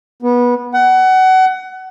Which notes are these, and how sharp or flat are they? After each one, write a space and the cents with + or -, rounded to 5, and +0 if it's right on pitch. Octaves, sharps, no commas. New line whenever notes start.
B3 -20
F#5 +25